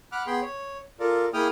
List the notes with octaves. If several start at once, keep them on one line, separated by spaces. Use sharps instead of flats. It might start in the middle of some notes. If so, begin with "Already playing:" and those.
F#5 B5 D6 F6 F#6
B3 G#4 G5 B5 C6
C#5
F4 A4 A#4 D5
A#3 E4 G#4 G5 D#6 F6